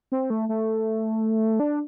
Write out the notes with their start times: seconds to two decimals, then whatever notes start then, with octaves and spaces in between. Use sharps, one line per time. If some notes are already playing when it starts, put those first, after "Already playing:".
0.12 C4
0.30 A3
0.49 A3
1.60 D4